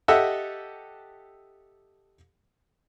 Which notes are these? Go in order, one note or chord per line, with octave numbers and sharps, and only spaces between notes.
G4 A4 D#5 E5 F#5